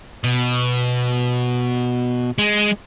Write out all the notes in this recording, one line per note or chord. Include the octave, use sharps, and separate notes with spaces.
B2
G#3